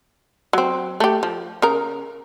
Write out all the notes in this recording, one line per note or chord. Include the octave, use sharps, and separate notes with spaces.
F#3 C4
A3 G4
F3
C#3 A#4